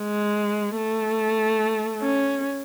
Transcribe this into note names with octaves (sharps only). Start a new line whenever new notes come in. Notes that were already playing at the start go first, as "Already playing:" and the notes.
Already playing: G#3
A3
C#4